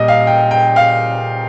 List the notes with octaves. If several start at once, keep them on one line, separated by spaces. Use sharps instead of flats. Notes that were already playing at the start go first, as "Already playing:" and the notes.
Already playing: A#2 G3 D#5
F5
G5
G5
F5